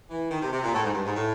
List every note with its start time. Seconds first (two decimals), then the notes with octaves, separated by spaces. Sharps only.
0.11 E3
0.31 D#3
0.42 C3
0.53 C3
0.63 A#2
0.74 A2
0.83 G#2
0.94 G2
1.05 G#2
1.16 A2